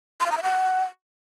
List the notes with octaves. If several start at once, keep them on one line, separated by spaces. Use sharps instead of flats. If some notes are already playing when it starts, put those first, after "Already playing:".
C6
F5
A#5
E5
F#5